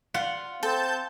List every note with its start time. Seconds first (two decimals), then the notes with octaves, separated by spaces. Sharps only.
0.14 F4 F#5
0.63 C4 A4 A5 G6